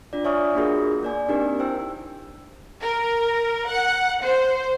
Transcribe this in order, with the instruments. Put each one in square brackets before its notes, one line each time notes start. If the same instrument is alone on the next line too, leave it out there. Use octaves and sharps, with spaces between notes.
[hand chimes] D4 F4 D5
C#5 E5 G#5 C#6 D#6 F6
A#3 D4 F4 F#4 G#4 A#4
A#3 D5 G#5
C4 D4 D#4 G4 A#4
E4 C5 G5 E6
[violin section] A#4
F#5
C5